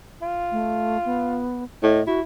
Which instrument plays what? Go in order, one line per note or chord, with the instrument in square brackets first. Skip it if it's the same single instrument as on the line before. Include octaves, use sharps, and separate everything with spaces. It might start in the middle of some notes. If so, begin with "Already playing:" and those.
[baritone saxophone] F4
[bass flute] A3
B3
[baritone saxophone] A2 [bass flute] D#5
[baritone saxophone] E4 [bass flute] F#4